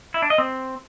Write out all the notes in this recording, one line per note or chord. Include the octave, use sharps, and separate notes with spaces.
E4
D4
D#5
C4